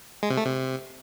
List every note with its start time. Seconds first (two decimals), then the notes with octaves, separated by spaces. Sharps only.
0.23 G#3
0.30 C3
0.37 A3
0.45 C3